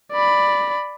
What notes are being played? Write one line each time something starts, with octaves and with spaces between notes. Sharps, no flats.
D5 B5